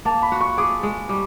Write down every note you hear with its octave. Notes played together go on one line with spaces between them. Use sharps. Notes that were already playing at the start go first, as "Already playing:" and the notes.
A#3 A5
B5
F#4
C#6
G#4 D6
G#3
G3